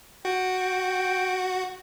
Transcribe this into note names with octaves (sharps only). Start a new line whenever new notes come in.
F#4 G5